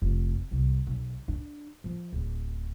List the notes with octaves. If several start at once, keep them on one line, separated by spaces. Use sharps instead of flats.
F1
C2
B1
D4
F3
D1